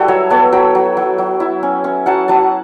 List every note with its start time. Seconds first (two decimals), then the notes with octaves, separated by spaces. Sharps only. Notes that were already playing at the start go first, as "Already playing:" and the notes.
Already playing: G3 E4 F#4 A4
0.08 F#3 C#5 E5
0.30 B3 A4 C#5
0.52 F#3 G5 B5
0.75 F#3
0.97 F#3
1.18 F#3
1.40 E4
1.63 C#4
1.84 C#4
2.06 F#3 F#5 A5
2.28 F#3 F#5 A5